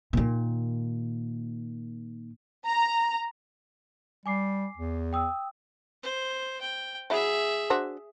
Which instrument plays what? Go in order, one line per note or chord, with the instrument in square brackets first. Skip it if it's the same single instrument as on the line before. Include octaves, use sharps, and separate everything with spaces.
[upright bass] A#2 D#3
[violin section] A#5
[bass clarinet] G3 [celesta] G#5 D6 C7
[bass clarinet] E2
[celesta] G5 D#6 E6
[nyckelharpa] C5
G5
[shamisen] F#3 E4 [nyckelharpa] G#4 E5
[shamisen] D4 F#4 C5